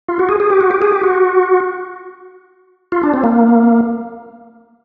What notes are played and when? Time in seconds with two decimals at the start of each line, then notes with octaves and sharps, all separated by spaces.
0.09 F4
0.19 F#4
0.29 G#4
0.40 G#4
0.50 G4
0.61 F#4
0.71 G4
0.82 G#4
0.92 G4
1.03 F#4
2.92 F4
3.03 D4
3.14 C4
3.24 A#3